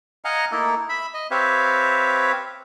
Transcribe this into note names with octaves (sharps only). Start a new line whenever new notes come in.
D#5 F5 F#5 G#5 A#5
A3 A#3 D#4 E4 A4
E5 B5
D#5
C4 G4 B4 C#5 E5 F5